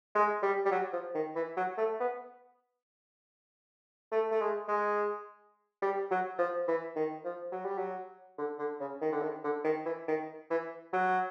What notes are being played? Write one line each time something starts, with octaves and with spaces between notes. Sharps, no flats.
G#3
G3
G3
F#3
F3
D#3
E3
F#3
A3
B3
A3
A3
G#3
G#3
G3
F#3
F3
E3
D#3
F3
F#3
G3
F#3
D3
D3
C#3
D#3
D3
D#3
D3
D#3
E3
D#3
E3
F#3